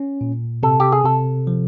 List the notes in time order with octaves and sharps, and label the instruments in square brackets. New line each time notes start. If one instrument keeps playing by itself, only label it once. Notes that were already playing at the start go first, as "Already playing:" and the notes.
Already playing: [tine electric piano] C#4
A#2
[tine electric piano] C3 [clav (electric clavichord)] A4
[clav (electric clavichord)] G4
G#4
[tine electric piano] C3 [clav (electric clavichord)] A4
[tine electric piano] F3